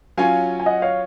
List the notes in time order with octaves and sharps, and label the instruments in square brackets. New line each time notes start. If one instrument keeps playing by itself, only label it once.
[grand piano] F#3 C#4 F4 [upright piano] F5 G#5
[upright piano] G#5
D#5 F#5
C#5 F5